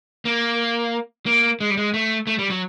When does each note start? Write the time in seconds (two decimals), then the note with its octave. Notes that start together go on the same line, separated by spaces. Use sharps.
0.25 A#3
1.26 A#3
1.60 G#3
1.70 G3
1.77 G#3
1.94 A3
2.27 A3
2.39 G3
2.50 F#3